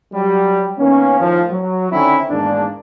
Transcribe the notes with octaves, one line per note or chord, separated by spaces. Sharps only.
F#3 G3
D#3 A#3 B3 C#4
F2 A2 D#3 F3
F#3
D3 D#3 C4 C#4 D#4 E4
E2 G#2 D#3 A#3 D4